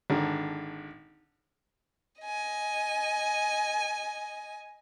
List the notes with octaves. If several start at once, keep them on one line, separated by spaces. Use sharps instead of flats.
G#1 D3
D#5 G#5